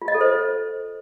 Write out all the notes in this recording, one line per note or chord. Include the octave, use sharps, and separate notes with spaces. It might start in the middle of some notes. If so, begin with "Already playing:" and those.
F4
D#5
A4
C5